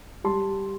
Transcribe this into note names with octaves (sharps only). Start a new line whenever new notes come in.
G3 A5 C6